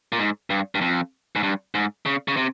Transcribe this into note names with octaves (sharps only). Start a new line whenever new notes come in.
A#2
G#2
G2
G2
F2
G#2
G2
G#2
C#3
C#3
C3